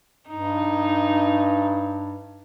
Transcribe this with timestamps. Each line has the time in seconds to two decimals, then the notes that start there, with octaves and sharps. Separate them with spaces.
0.30 G2 D#4